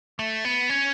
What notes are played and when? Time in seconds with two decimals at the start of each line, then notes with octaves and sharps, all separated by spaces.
0.19 A3
0.45 B3
0.70 C#4